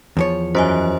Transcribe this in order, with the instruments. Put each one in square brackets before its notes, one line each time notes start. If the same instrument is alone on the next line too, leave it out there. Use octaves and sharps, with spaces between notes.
[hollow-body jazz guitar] E2 F3 C#5
[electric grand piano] F#2 [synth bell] C5 D#5 G#5